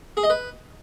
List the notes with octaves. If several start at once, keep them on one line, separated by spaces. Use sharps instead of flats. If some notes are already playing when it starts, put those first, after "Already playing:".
G#4
D#5
B4